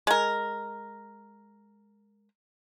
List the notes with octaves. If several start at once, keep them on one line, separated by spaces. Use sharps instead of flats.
G#3 A#4